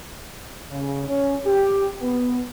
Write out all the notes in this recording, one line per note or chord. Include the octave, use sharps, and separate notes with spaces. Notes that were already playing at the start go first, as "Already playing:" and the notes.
C#3
C#4
G4
B3